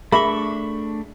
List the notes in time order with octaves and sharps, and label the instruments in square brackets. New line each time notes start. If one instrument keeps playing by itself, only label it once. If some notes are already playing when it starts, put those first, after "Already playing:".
[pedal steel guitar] A3 D4 C#6 [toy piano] G#4 A#4 E5 [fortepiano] B5